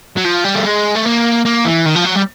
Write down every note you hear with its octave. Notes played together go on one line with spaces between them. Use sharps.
F#3
F3
G3
A3
G#3
A3
A#3
A#3
E3
D#3
F3
F#3
G3